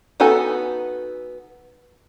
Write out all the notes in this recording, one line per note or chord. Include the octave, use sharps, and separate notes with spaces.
B3 D#4 F#4 A4 G#5